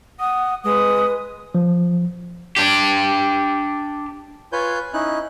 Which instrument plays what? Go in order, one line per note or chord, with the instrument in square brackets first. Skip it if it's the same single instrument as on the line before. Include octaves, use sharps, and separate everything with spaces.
[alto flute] F#5 [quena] D#6
[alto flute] G#3 [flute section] B4 [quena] D#6
[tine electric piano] F3
[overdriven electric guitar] D4 G4
[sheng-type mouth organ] F4 B4 C#5 G#5 G6
C#4 D#4 E4 F#6